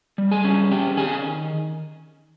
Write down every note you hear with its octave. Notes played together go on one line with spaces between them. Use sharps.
G3
G#4 G#5
C#4
C#4 G4 G5
D#3 G#4 G#5